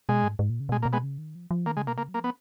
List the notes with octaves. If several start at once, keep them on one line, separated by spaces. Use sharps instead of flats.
B2 G#3
G#2
G#2
A#2
C#3
B2 G#3
A#2
A#3
B2
G#3 B3
C#3
D#3
F3
F3
D#3 A#3
C#3 G#3
B2 A#3
C#3 A#3
F#3
A#3
F3 B3